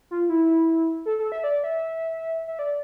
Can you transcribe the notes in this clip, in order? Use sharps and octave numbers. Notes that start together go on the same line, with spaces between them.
F4
E4
A4
A4
E5
D5
E5
E5
D5